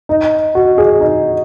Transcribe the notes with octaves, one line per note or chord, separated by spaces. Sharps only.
D#4
F#4
G#4
D#4